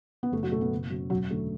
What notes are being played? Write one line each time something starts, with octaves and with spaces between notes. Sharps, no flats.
B3
F#1 A3
F#3
B2 A3
B3
F#1
F#2
E1 F#3
D3 A3